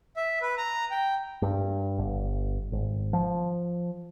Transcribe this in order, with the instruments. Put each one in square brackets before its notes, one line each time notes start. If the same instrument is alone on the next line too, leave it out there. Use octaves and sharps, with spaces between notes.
[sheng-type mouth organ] E5
B4
A#5
G5
[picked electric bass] G2
G1
G#1
F3